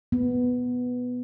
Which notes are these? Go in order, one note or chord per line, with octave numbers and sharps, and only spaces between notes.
B3